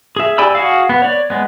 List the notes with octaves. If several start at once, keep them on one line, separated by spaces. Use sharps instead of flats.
G#4 E5
G4 D5 G#5 B5 E6
F#4 G#4 F5
B3
C#5 D5
G#3 B3